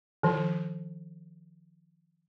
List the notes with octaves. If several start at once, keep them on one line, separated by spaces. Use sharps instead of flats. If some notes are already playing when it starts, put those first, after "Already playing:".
D#3 F3